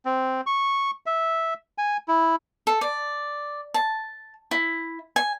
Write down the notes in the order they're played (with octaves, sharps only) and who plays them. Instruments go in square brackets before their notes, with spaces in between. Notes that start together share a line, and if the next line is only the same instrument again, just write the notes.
[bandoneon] C4
C#6
E5
G#5
E4
[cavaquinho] A4
D5
A5
E4
G#5